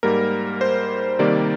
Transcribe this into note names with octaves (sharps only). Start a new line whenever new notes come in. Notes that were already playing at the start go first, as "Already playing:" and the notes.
G#2 G3 A#3 A#4
C5
C3 D#3 G3 A#3 D5